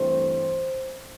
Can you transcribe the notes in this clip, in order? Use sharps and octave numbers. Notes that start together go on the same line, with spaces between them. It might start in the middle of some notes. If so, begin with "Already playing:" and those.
Already playing: G2 E3 A3 C4 C5